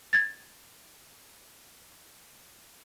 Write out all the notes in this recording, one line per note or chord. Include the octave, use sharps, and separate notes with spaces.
G#6 A6